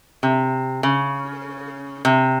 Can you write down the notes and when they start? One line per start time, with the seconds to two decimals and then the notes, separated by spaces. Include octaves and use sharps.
0.23 C3
0.83 C#3
2.05 C3